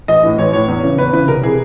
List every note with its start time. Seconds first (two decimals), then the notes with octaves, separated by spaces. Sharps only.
0.08 A1 D#5
0.23 A2 E3
0.38 A1 C#5
0.53 A2 E3 C#5
0.68 E2
0.83 C#3 E3
0.98 E2 B4
1.13 C#3 E3 B4
1.28 C2 A#4
1.43 C3 E3 G#4